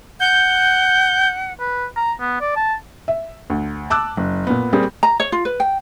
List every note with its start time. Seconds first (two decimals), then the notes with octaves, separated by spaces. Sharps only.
0.20 F#5 G6
1.59 B4
1.96 A#5
2.20 B3
2.41 D5
2.56 A5
3.08 E5
3.50 D2
3.90 A5 D6 E6 F#6
4.17 F#1
4.47 A#2 B3
4.73 G3 A#3 C4 G#4
5.03 A#5
5.20 C#5
5.32 F4
5.45 B4
5.60 G5